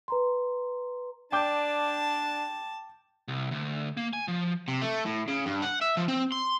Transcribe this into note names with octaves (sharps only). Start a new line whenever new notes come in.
B4 A#5 C6
D4 G5 A5 D6 G6
C2
D2
A#3
G#5
F3
C3
A3
A2
C#3
G2
F#5
E5
F3
C4
C6